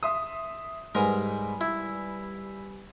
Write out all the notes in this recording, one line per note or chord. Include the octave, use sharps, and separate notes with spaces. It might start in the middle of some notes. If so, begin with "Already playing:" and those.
E5 C6 D#6
G#2 G3 A#4 B4 G#5
E4